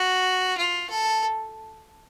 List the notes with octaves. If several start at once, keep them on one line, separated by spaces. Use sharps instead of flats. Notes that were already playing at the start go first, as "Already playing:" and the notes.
Already playing: F#4
F4
A4